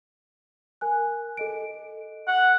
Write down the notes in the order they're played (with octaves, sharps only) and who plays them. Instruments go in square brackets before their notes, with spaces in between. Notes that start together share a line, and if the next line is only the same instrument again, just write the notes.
[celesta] A#4 G#5 F#6
A4 D#5 D7
[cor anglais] F#5